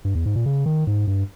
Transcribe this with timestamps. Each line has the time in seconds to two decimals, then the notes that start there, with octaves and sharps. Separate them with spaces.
0.05 G2
0.15 E2
0.26 G#2
0.36 A#2
0.46 C#3
0.66 D#3
0.87 G#2
1.07 G2